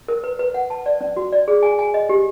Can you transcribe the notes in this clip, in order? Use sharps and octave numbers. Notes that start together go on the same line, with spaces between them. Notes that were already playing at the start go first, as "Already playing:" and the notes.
A#4
B4
B4
F#5
A5
D5
C#4
F#4
D5
G#4
G#5
G#5
D#5
G4